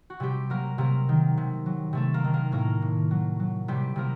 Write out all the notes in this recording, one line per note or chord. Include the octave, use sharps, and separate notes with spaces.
F#4
C3 G3 G4
F#3 A#3 A#4
C3 A#3 A#4
D#3
C3
F#3
C3 A3 A4
A#3 A#4
D#3
A#3 A#4
A2 A#3 A#4
A2
F#3
F#3
C3 G3 G4
C3 A#3 A#4